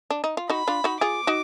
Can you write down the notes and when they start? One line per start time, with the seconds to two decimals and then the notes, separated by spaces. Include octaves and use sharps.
0.10 D4
0.24 D#4
0.37 F4
0.50 D#4 F#4 B5
0.68 D4 F4
0.84 D#4 F#4
1.01 F4 G#4 D6
1.27 D#4 F#4